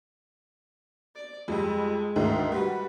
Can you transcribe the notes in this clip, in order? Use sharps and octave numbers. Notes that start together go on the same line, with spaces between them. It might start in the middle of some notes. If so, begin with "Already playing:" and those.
D5
F2 G3 G#3
D2 G#2 D#3
G3 F#4 B4